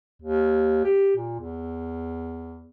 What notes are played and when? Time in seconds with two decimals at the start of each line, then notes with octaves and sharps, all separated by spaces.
0.22 D#2
0.84 G4
1.16 A#2
1.40 E2